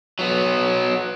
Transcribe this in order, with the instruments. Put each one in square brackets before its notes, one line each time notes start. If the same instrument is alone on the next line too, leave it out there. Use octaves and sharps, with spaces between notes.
[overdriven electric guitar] F#3 B3